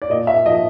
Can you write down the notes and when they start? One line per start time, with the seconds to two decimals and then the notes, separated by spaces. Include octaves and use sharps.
0.02 D5
0.10 A#2 D#5
0.27 E5
0.46 F3 D#5